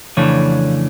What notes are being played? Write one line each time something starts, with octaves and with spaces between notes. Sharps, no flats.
F2 C#3 E3 A3 D4 C#5